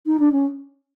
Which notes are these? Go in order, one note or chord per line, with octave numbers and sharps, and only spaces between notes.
D#4
D4
C#4